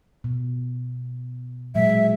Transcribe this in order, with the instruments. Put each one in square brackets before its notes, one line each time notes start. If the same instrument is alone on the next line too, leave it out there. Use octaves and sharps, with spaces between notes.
[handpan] B2
[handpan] A#2 F#3 G#3 [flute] E5